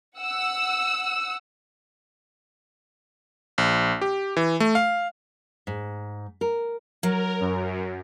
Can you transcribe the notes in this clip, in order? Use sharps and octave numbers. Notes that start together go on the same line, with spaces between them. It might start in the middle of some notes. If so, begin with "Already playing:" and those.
F#5 E6
A#1
G4
E3
A3
F5
G#2
A#4
F#3 A#4
F#2